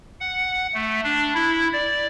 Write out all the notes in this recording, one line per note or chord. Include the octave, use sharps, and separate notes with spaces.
F#5
A3
D4
E4
D5